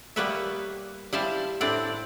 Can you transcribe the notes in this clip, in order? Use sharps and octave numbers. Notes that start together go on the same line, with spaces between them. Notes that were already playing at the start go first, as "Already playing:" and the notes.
G3 A#3 B3 B4 C#5 E5
G3 E4 C5 E5 F5 A5
A2 C4 D4 E4 D5